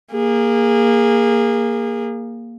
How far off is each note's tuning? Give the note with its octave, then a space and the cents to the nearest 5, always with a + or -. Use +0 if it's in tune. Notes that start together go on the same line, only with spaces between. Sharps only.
A#3 +0 G#4 -25